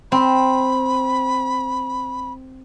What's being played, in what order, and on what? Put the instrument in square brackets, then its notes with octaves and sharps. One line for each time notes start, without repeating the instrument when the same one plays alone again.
[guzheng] C4 [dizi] B5